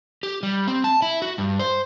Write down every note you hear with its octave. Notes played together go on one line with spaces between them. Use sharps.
G4
G3
C4
A5
E4
F#4
G2
C5